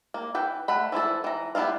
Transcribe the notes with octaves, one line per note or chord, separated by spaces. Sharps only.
A#3
E3 B4 G5
A3 F#5 B5
E3 F3 E4 A4
E3 A#5
G3 B3 E4 F4 F5